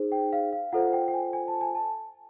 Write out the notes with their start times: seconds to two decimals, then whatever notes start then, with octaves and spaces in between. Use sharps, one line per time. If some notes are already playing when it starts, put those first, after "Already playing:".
Already playing: D#4 G#4 C5
0.12 G5
0.33 F5
0.53 F5
0.72 F4 A4 C5 F#5
0.93 G5
1.08 G5
1.13 G#5
1.33 G#5
1.48 A5
1.61 G#5
1.75 A5